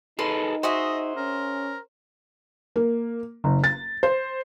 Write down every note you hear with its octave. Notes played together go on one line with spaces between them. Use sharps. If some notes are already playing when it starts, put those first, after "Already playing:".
D#4 G#4 A4 B4 C6
F#4 G#4 C5 D#5 E5
C#4 A#4
A#3
F#1
A6
C5